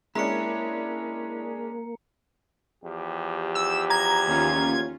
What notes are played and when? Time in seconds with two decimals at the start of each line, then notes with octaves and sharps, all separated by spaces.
0.15 G#3 A#3 C#4 D4 E4 A#5 C#7
2.84 E2 F3 G4
3.55 E6
3.90 A#5 G#6
4.27 D#2 C#4 F4